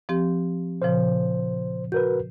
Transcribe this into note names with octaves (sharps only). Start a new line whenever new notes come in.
F3 C4 G4
A#2 C#3 F3 C5
F#4 A#4 B4 G6